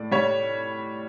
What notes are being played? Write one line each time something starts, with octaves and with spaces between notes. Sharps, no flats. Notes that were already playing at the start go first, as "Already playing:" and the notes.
Already playing: A2 D5
G3 C#5